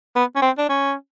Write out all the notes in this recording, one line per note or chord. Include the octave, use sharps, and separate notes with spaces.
B3
C#4
C4
D4
C#4